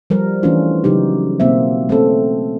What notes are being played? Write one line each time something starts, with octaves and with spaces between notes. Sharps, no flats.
F3 G3 A#4
E3 A3 C#4 D4 F4
C#3 F#3 D#4 G4
B2 A#3 C4 E5
A3 C4 C#4 A4